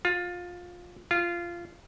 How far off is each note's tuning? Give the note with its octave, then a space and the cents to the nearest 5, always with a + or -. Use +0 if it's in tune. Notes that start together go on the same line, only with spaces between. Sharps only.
F4 +20
F4 -15